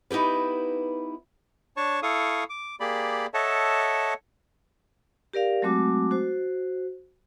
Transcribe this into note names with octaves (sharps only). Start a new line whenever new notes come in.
B3 D#4 E4 G4 B4
D4 C#5 A5 C#6
E4 A4 F5 C#6 D#6
D6
A#3 G4 G#4 D5 B5
A4 C#5 D#5 E5 F#5 A5
G4 A#4 D5 F5
F#3 G#3 A3 C4 F#4 D6
F#4 C5